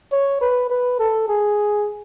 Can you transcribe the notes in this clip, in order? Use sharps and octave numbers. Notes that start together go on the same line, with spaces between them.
C#5
B4
B4
A4
G#4